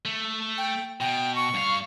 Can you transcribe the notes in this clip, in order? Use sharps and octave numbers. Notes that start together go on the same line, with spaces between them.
A3
G5
B2 G5
C#6
G2 F5